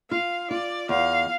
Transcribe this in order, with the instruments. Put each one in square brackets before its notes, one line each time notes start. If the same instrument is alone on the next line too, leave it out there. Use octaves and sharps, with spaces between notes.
[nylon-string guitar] F4 [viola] F5
[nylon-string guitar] F4 [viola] D5
[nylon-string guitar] E2 [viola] F5